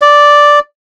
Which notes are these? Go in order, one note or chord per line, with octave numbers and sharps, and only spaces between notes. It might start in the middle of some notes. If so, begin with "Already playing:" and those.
D5